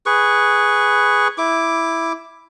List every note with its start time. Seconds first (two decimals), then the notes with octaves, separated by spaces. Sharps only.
0.06 G#4 B4 C#6
1.38 E4 D6